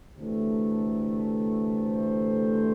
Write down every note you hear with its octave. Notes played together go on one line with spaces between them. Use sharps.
D2 C3 E3 A3
C5